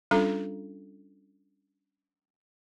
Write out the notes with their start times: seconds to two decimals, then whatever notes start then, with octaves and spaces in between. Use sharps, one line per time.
0.11 G3 C#4 D4 F4 A4 A#5